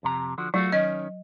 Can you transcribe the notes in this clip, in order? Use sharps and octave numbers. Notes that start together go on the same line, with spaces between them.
F2 C3 A#5
D3 F3 F#4
F#3 A3 F4 F#4
D#3 C#4 D#5